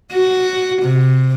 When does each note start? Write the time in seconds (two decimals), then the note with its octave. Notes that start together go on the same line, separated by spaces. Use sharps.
0.13 F#4
0.83 C3